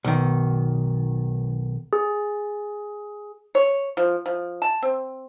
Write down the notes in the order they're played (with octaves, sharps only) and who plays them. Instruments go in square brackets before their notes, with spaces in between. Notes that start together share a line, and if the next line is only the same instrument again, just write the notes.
[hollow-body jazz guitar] B1 D#3
[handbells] G#4
[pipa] C#5
F3
F3
A5
C4